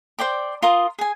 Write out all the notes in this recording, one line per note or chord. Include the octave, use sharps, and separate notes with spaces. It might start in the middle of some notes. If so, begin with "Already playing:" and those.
C5 D5 G5 D6
F4 A#4 C6 D#6
G#4 G#5